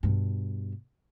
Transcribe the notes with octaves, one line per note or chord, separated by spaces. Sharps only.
G2 B2